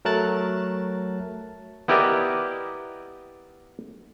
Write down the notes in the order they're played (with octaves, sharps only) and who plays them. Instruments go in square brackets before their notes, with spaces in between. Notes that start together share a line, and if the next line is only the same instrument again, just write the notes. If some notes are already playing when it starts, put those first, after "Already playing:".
[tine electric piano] F#3 A3 A#4 A5 F#6 A6
[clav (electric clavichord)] B3 E4 G4 A#4 D5 D#5